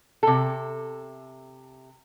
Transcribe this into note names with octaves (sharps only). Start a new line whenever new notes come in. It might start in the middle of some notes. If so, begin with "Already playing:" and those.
C3 A4